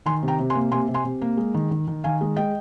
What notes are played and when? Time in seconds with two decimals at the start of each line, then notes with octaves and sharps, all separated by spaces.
0.06 D#3 G#5 C6
0.23 C3
0.28 G5 A#5
0.39 C3
0.50 G#5 C6
0.55 A#3
0.72 C3 G#5 C6
0.88 C3
0.94 G#5 C6
1.05 C3
1.21 A#3
1.37 G#3
1.54 D#3
1.71 D#3
1.88 D#3
2.04 D#3 F5 G#5
2.21 G#3
2.36 G#3 D#5 G5